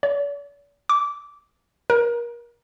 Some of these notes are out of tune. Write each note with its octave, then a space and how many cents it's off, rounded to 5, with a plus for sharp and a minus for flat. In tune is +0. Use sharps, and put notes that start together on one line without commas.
D5 -45
D6 -15
A#4 +30